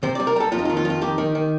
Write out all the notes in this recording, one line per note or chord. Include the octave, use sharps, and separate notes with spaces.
C3 C5
G3 D5
A#4
G3 A4
F2 F4
D#4
F4
D#3
F4
F2
F4
D#3 G4
D#3
D#3